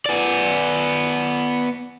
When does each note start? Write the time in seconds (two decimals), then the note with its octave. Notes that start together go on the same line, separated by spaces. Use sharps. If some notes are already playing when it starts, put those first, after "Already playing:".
0.06 B3 D5